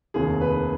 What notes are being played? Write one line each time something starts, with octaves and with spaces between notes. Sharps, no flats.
F1 D#2 D#3 G#4
B4